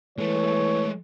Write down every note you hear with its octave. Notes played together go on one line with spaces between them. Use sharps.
E3 G#3 A3 C#5